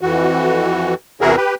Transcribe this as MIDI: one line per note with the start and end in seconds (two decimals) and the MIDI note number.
0.01 0.94 41
0.01 0.94 52
0.01 0.94 66
1.21 1.36 40
1.21 1.36 48
1.21 1.36 64
1.21 1.36 66
1.21 1.36 68
1.21 1.36 70
1.37 1.55 67
1.37 1.55 71